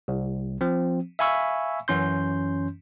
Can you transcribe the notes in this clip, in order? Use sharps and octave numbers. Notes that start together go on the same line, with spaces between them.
C2
F3 C4
E5 F5 G#5 B5 C#6 E6
F#2 E3 C#4 C6 G6